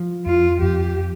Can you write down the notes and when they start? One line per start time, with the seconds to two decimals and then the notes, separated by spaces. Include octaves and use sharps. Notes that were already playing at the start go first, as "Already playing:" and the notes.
Already playing: F3
0.26 F2 F4
0.62 F2 G4